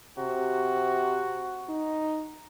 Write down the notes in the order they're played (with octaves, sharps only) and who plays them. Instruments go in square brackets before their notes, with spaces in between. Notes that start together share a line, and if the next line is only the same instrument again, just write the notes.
[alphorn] C3 [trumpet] F#4
[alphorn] D#4